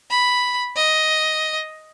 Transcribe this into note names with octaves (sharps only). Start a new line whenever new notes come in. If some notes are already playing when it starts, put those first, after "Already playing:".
B5
D#5